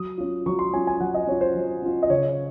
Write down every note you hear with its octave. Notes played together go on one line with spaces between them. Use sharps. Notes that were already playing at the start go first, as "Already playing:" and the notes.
Already playing: F#3 D#6
C#4 F4
F#3 C#6
C6
C#4 F4 G#5
G#5
F#3 F#5
D#5
C#4 F4 C#5
C5
F#3
C#4 F4
D#5
C#3 C#5